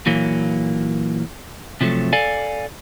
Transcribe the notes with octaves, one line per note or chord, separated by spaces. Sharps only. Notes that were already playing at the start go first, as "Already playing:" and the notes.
A#2 E3 F#3 A#3
C3 F3 F#3 A3
A4 D5 F5 G#5